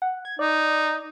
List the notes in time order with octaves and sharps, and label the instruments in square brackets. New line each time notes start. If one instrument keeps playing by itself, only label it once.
[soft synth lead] F#5
G#6
[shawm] D#4 [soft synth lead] D5